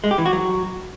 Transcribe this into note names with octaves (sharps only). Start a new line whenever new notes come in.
G#3
G4
E3
F#4
F#3